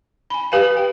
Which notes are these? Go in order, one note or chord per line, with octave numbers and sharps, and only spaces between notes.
G#5 B5
G4 B4 F5 G#5
G5